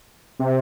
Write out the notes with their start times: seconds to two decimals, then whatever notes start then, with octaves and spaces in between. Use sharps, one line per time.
0.39 C3